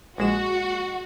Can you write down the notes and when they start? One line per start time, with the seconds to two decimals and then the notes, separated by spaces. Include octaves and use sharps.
0.18 A#1 G#3 F#4 E7